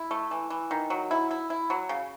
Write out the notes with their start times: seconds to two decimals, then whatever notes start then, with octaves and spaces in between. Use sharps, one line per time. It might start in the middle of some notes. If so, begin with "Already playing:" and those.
Already playing: E4
0.11 A3
0.31 E3
0.50 E3
0.71 D#3
0.90 F#3
1.11 E4
1.31 E4
1.50 E4
1.70 F#3
1.89 C#3